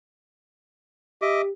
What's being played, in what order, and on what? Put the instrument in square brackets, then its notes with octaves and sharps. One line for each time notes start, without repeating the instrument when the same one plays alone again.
[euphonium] G4 [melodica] D#5 E5 D6